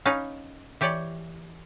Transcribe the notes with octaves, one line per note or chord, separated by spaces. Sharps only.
C#4 D#4 B4 F5
E3 G4 C#5 D5